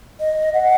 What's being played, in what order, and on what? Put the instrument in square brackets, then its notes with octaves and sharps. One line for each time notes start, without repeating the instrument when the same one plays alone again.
[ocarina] D#5
F#5